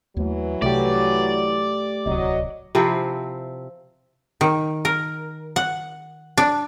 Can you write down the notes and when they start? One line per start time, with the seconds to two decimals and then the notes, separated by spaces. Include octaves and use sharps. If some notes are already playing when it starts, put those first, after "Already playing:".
0.17 D#2 E3 F#3 A3
0.62 C2 C3 A3 G4 D5
2.06 D1 C2 F#3 D#5
2.75 C3 F3 C4 E4
4.41 D#3
4.85 A#4
5.56 F#5
6.37 D4